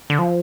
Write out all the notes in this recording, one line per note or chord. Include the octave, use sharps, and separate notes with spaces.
D3
F3